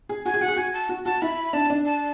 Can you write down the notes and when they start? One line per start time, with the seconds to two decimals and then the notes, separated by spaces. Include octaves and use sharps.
0.09 G#4
0.26 F#4 G#5
0.34 G#4
0.41 F#4 F#5
0.48 G#4
0.56 F#4 G#5
0.74 A5
0.89 F#4
1.06 F#4 A5
1.22 E4 B5
1.53 D4 A5
1.70 D4
1.85 A5